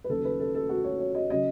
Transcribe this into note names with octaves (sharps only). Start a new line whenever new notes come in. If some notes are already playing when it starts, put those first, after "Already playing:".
B4
D#2 C#3 F#3 A4
B4
A4
A4
F#4
C#5
C#5
D#5
C#3 F#3 D#5